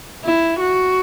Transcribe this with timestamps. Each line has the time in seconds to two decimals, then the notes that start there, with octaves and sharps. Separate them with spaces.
0.24 E4
0.60 F#4